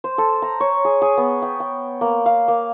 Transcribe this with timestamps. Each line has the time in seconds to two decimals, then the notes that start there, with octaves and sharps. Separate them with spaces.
0.04 C5
0.18 A4
0.42 A#5
0.60 C#5
0.85 G#4
1.02 G#4
1.17 B3
1.42 G5
1.60 G5
2.01 A#3
2.26 F5
2.48 A#3